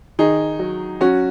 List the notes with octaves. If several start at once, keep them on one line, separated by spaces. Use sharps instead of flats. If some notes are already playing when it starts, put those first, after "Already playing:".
D#3 D#4 G#4
F#3
F#3 C#4 F#4